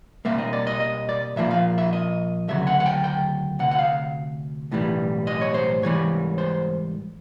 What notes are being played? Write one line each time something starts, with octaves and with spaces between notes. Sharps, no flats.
B2 G3 A#3 E5
D#5
D5
D#5
D#5
D5
A#2 F3 A#3 E5
F5
E5
D#5
D2 C#3 F#3 E5
F#5
F#5
G5
G5
D2 C3 F#5
F#5
F5
B1 A2 E3 G3
D#5
C#5
C5
G#2 E3 G3 C#5
C5